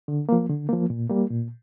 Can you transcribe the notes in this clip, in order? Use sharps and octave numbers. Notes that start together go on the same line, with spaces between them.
D3
F3 A#3
D3
F3 A#3
A#2
G3 A#3
A#2